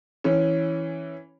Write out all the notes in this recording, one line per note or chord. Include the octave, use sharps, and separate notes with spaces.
E3 C#4